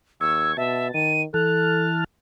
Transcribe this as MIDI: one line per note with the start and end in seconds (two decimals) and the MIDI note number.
0.21 0.53 39
0.21 0.57 85
0.21 0.52 88
0.21 0.57 92
0.57 0.92 47
0.57 0.88 76
0.57 1.13 81
0.94 1.25 51
0.94 1.22 99
1.34 2.04 52
1.34 1.89 69
1.34 2.04 81
1.34 2.04 89
1.34 2.01 90